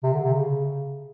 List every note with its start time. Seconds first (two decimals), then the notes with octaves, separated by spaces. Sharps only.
0.03 C3
0.13 D3
0.23 C3
0.33 C#3